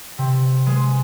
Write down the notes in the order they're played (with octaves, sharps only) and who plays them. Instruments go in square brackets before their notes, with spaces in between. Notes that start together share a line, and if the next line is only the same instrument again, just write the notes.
[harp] C3
G#3